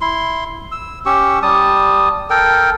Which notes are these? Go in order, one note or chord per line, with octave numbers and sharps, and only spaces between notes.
E4 C6
E6
C#4 G4 C#6 E6
G3 A5 D#6
A4 A#4 G5